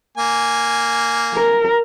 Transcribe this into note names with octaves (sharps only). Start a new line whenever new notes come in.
A#3 G#5
A#4